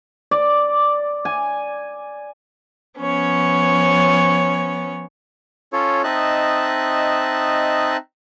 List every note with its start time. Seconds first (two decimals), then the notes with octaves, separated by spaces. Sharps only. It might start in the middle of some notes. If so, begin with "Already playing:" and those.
0.31 D5
1.25 G#5
3.00 F3 B3 C#4 C#5
5.73 C#4 F4 A4 C#5
6.04 C4 D#4 D#5 E5 A5 F#6